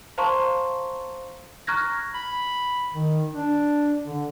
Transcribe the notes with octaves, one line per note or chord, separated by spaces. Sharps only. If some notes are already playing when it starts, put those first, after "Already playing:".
C5 F5 A5 A#5 C6 C#6
A#5 C#6 F6 F#6 G#6 A#6
B5
D#3
D4
D3